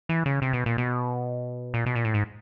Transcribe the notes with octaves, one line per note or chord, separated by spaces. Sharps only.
E3
C#3
C3
B2
A#2
B2
A#2
B2
A#2
A2
G#2